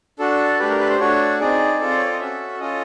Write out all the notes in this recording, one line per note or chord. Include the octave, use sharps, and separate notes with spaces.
D4 F#4 A4
A3 D4 G4 B4
A#4
B4
C5
A3 D4 F#4 C#5
C4 D#4 G#4 D5
C4 F4 A4
C5
C#5
D5
D#5
C#4 F#4 A4 E5
C#4 F4 A4 D#5